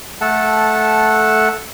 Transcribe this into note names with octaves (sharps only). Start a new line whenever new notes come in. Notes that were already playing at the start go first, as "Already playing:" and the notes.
A3 A4 F#5 A5